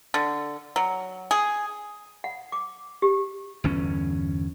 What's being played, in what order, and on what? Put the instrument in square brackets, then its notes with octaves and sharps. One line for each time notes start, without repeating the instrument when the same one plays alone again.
[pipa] D3
F#3
G#4
[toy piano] F#5
D6
G4
[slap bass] G1 E2 C#4